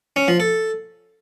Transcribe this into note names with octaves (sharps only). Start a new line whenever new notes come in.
C#4
F3
A4